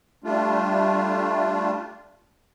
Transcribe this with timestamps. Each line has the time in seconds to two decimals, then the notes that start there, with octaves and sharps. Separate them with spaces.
0.24 G3 A3 D4 F4